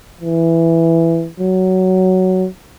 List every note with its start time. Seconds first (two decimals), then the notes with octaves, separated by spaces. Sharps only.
0.21 E3
1.40 F#3